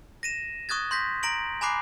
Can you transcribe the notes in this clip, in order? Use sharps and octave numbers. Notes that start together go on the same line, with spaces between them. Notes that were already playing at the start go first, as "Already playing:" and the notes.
A#6 D#7 E7
C#6 D#6 F#6 G#6 A6
C6 G6 A#6 B6
A#5 A#6 D7 F#7
G#5 A#5 B5 D6 F#6 C7